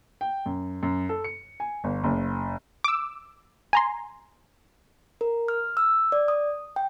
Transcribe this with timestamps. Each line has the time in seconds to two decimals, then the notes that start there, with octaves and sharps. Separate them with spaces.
0.21 G5
0.46 F#2
0.83 F#2
1.09 A4
1.24 C#7
1.60 G#5
1.84 G1
2.04 F#1
2.84 D6 E6
3.73 G#5 A#5 C6
5.21 A#4
5.48 F6
5.77 E6
6.12 D5
6.28 D#6
6.76 G5